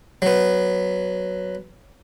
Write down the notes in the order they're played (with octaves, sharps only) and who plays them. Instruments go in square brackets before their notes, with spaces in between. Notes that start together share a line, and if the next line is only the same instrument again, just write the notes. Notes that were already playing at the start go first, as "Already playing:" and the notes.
[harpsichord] F#3 B3